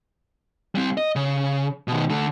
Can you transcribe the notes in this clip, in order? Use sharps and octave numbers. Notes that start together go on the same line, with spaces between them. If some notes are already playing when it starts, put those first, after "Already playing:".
G3 C4
D#5
C#3
B2 D#3
D3 A3